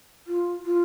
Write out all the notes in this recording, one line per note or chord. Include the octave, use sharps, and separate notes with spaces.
F4
F4